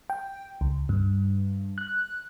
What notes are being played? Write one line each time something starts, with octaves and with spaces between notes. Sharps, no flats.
G5
C#2
G2
F#6